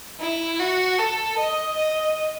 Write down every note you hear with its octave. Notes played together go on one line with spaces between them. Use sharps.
E4
F#4
A4
D#5
D#5